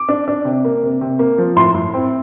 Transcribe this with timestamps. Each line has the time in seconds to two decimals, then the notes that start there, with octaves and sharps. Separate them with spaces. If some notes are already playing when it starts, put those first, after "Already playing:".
Already playing: D6
0.09 D4
0.28 D4
0.45 C3
0.65 A#3
0.83 C3
1.01 C3
1.19 A#3
1.38 F3
1.56 A2 C6
1.75 A2
1.94 C4